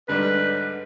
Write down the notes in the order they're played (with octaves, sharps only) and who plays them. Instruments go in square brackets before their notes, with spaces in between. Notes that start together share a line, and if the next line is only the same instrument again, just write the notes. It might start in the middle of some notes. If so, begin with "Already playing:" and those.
[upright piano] G#2 D3 G3 [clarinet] B4